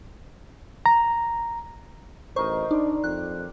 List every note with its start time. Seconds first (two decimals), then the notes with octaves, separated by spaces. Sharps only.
0.86 A#5
2.36 A1 D#4 A#4 C5 C#6 D#6
2.71 D4 D#4 D5 C6
3.04 F2 G5 F#6